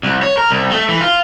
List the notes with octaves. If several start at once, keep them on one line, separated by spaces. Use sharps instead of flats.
C2
C#5
A#4
C2
A3
E3
F4